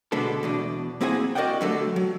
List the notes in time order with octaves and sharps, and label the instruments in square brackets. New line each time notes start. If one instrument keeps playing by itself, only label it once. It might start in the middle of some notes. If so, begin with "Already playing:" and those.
[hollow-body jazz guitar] B2 D3 G#3 B3 D4 A4
E2 B2 D4
A#3 C4 E4 G#4 F#5 G#5
F#4 A#4 D5 D#5 F#5 G5
D3 F#3 G3 A3 F#4 A4
F#3